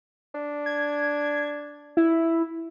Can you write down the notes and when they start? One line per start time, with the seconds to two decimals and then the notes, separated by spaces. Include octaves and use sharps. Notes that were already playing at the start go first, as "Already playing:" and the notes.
0.35 D4
0.66 G#6
1.97 E4